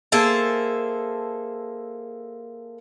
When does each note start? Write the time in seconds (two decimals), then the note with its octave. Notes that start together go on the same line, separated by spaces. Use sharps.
0.12 A#3 G#4 A4 C5 E5 A5